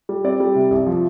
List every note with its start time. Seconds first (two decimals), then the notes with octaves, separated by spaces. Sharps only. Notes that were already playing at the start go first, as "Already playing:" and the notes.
0.09 G3
0.24 C4 D5
0.40 G3
0.55 C3
0.71 C2
0.87 F3